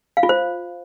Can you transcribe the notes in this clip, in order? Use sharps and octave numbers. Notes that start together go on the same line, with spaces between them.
F5
F4
C5